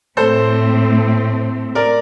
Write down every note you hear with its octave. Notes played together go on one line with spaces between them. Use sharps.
A2 A3 C4 A4 C5
A#4 D5